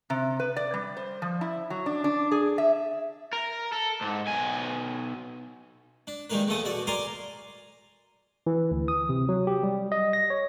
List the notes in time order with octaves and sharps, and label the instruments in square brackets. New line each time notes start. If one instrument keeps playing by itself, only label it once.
[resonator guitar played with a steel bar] C3
B4
D5
G3
C5
F3
E4
F#3
D4
D4
G#4
E5
[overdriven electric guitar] A#4
A4
G#2
B1 G#5
[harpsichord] D4
D#3 G3 G#3 A#3 A#4 B4
E2 A#2 A3 A4 D#6
B2 F#4 D5
A#4 D5 G#5 A#5 C6 D6
[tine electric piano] E3
D2
D#6
C3
F#3
G4
G3
D#5
A#6
C#5